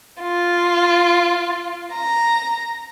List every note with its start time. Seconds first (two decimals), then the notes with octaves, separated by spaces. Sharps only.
0.20 F4
1.92 A#5